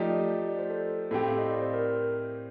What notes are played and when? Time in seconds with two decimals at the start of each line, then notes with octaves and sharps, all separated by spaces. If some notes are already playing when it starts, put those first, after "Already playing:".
Already playing: F3 A3 D#4 G4 D5
0.49 D5
0.59 C5
0.70 A4
1.11 A2 A3 C4 G4 A4
1.27 F5
1.38 D#5
1.50 D5
1.62 C5
1.73 A#4